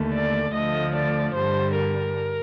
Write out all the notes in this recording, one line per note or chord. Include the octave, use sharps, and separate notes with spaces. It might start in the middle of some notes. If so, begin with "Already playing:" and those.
Already playing: D#2 D3 A3
D5
D2 D3 F3 A3 D#5
D5
G2 D3 G3 C5
A#4